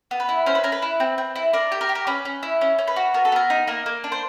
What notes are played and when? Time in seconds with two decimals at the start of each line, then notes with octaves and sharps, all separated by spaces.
0.11 B3
0.20 B4
0.29 E4
0.46 C#4 C5
0.55 B4
0.64 C#4 A#4
0.72 B4
0.82 E4
1.00 C4
1.18 C4
1.36 E4
1.53 D4 A#4
1.72 G4
1.81 A#4
1.89 G4
1.95 A#4
2.07 C#4 B4
2.25 C#4
2.43 E4
2.61 C#4
2.79 C#4
2.88 B4
2.96 F#4
3.14 B3 A#4
3.25 A4
3.32 B3 A#4
3.50 D#4
3.67 A#3 A#4
3.86 A#3
4.04 D4
4.12 C5